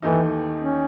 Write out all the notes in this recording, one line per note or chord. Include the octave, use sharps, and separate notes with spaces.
D#2 D#3 E3 A3 D#4
C#4